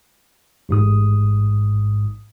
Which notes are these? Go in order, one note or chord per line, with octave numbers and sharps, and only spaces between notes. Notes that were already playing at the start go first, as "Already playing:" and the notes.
A1 G#2 D#6